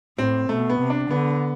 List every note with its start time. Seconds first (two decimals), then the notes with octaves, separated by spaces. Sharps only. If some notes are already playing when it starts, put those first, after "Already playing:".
0.18 A2 C4
0.49 B2 A3
0.69 B3
0.80 C3
0.90 D4
1.10 D3 B3